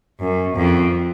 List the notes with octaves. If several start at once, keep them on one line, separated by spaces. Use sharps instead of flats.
F#2
F2